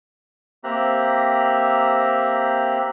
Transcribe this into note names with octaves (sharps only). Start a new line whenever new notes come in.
A#3 C4 G4 E5 A#5 F#6